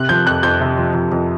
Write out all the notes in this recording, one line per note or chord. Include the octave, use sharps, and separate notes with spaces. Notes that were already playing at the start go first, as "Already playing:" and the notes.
Already playing: C3 F#6
F3 G6
F2 F#6
F2 G6
C3
F3
F2
F2